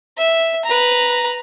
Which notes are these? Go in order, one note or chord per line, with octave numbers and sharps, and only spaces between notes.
E5
B4 A#5